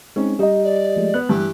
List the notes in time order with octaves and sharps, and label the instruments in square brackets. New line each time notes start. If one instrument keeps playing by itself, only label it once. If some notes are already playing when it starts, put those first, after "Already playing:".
[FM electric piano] G#3 C4 D#4 [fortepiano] C#4
[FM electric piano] G3 [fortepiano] D#4 [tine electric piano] G4 D#5
[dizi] D5
[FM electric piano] F3 G#3 A3
[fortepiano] B3 [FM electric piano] F#6
[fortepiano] G2 E3 [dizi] G4